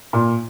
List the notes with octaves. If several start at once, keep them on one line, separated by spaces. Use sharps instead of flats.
A#2